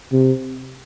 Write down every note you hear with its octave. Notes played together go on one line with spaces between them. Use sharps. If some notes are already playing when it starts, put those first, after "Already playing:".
C3